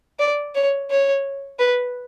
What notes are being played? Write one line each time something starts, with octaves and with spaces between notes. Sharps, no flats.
D5
C#5
C#5
B4